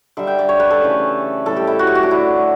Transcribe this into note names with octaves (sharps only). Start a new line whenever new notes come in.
D3 G3 E5
G5
D5
C#5
B4
A4
C#3 E3 A3
A2 G3 A4
G4
E4
F#4
G4
F#4
D4
D3 A3 E4